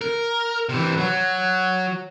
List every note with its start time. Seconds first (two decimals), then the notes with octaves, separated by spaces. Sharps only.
0.01 A#4
0.69 C3 E3
0.97 F#3